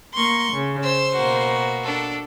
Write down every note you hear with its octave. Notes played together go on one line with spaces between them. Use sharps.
A#3 C6 C#6
C#3
C5 E6
B2 A#3 F#4
D4 A4